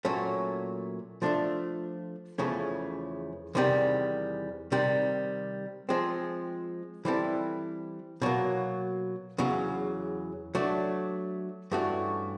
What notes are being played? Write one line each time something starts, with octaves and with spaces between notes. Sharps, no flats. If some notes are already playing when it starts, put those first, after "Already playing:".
A#2 F#3 A3 C#4
F3 A3 D4 F4 A4
E2 C#3 F3 A3 C#4
E2 C3 D#3 G3
C3 D#3 G3
F3 G#3 C4
E3 G3 C4 E4 A4
B2 F#3 A#3
E2 C#3 F#3
F#3 A3 D4
G2 E3 A3 C#4 F#4